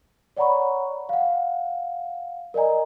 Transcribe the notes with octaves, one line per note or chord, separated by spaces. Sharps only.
C#5 D5 F#5 A#5 B5 C#6
F5 F#5
A#4 D5 D#5 G#5 A#5